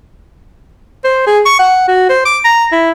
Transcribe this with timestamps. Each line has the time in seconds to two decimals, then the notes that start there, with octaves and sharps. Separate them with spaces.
1.04 C5
1.26 G#4
1.45 C#6
1.59 F#5
1.88 F#4
2.09 C5
2.25 D6
2.44 A#5
2.72 E4